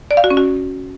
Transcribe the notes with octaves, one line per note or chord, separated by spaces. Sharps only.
D5
F5
F#4
C#4
F#4